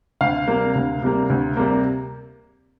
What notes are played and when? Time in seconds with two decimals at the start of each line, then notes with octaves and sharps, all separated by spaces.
0.21 D2 F5
0.48 C3 G3 A#3
0.75 D2
1.02 C3 G3 A#3
1.30 D2
1.57 C3 G3 A#3